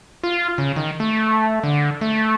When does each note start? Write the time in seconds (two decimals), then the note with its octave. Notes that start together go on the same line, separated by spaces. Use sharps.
0.23 F4
0.58 C#3
0.76 D#3
1.00 A3
1.63 D3
2.01 A3